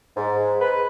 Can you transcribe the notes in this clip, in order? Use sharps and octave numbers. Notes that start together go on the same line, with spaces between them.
G#2
B4